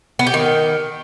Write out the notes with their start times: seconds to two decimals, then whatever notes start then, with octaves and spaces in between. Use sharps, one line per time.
0.19 B3
0.27 G4
0.34 D#3